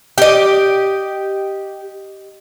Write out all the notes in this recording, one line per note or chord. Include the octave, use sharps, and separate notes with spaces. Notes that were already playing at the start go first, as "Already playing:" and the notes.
G4 D#5